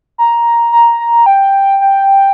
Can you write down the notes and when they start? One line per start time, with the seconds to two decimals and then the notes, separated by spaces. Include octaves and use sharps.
0.18 A#5
0.72 A#5
1.00 A#5
1.26 G5
1.81 G5